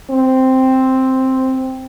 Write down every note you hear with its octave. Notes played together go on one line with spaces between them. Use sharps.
C4